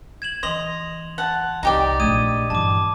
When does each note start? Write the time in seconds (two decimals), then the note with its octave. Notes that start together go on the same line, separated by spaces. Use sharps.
0.22 G#6 E7 F#7
0.43 E3 D#5 C6 F7 F#7
1.18 F#5 A5
1.63 C2 D#4 G4 D5
2.00 A#1 A3 D#6 G#6 D#7
2.50 G2 E3 A5 D6